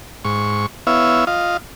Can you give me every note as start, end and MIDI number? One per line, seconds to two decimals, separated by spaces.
0.25 0.66 44
0.25 0.66 85
0.87 1.25 59
0.87 1.25 64
0.87 1.25 73
0.87 1.25 76
0.87 1.25 77
1.27 1.57 65
1.27 1.57 75
1.27 1.57 77